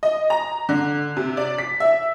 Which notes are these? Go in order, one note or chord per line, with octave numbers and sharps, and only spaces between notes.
D#5
A#5
D3
C3
D5
B6
E5